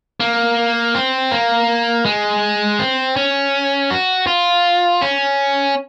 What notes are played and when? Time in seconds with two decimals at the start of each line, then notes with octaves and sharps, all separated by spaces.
0.20 A#3
0.95 C4
1.31 A#3
2.05 G#3
2.79 C4
3.16 C#4
3.91 F#4
4.27 F4
5.02 C#4